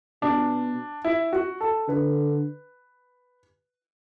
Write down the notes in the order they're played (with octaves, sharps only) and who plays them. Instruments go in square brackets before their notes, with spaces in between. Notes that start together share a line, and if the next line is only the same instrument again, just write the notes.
[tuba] B2 [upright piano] D4
[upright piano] E4
F#4
A4
[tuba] D3 [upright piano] B4